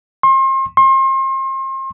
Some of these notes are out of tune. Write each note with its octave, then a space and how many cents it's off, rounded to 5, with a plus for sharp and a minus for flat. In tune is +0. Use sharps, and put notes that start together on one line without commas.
C6 +35
C6 +35